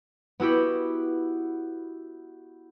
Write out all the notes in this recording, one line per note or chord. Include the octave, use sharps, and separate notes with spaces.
B3 E4 F#4 G4